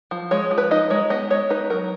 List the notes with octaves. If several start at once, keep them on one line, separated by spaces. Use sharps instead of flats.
F3
G#3 C#5
F3
B4
D#4 D#5
G#3 C#5
B3 D#5
G#3 C#5
D#4 B4
F#3 A#4